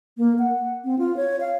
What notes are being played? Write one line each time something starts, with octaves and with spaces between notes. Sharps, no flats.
A#3
F#5
C4
F4
C#5
F5